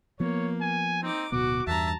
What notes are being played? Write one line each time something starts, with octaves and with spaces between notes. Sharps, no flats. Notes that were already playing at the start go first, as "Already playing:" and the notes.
F3 A#3 B3 C#5
G#5
C4 D#4 D6
D1 B2 B3 F#4 D6
E2 G2 E5 A5 A#5